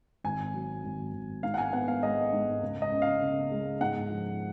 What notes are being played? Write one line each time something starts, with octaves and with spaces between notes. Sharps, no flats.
G#1 G#5
F#3
G#1
G#1
G#2 F5
F#5
G#5
B3 F#5
F5
G#3 D#5
G#2
C#2
D#5
C#3
F5
C#3
G#3
G#2 F#5
F3